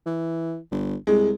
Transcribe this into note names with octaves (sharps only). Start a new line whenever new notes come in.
E3
G1
C2 G#3